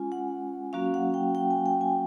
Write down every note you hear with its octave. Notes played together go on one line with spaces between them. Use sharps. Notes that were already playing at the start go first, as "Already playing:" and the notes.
Already playing: G#3 C#4 F4 G#5
F#5
F#3 A#3 C#4 F#4 F5
F#5
G5
G5
G#5
G5
G#5